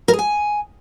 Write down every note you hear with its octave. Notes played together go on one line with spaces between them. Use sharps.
A#4
G#4
G#5